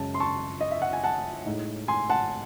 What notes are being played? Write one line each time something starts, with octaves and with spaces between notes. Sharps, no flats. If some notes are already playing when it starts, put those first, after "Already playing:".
Already playing: F#2 C#3 G#3 A5
C6
A5 C#6
D#5
E5
F#5
G#5
F#5 A5
A2 G#3 D#4
G#5 C6
F#5 A5